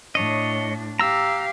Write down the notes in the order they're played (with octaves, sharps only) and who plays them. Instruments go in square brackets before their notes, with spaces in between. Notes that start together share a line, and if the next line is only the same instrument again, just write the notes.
[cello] A2 D4 [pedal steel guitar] C#5 D#5
[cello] G4 F5 [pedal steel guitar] A#5 E6